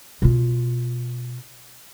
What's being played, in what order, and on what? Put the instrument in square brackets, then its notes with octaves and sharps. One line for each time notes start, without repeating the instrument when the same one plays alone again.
[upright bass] B2 F4